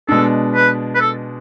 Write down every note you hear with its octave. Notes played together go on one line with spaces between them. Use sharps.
B2 G#3 D4 A4
B4
B4
A4